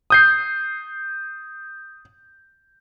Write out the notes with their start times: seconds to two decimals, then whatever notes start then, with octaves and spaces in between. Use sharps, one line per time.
0.10 D#6 G6 C7